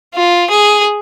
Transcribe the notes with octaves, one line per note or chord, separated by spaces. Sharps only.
F4
G#4